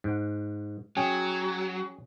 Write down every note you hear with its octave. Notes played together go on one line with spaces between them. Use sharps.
G#2 F#5
F#3 C#4 G#4 G5